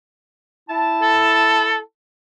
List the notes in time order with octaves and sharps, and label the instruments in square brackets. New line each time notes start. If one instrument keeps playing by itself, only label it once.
[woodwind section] E4 A5
[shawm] A4